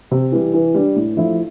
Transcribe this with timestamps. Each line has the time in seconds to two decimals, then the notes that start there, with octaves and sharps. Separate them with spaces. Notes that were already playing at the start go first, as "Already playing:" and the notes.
0.11 C3
0.32 E3 G3
0.54 E3
0.75 G3 D4
0.96 A2
1.17 F3 A3 E4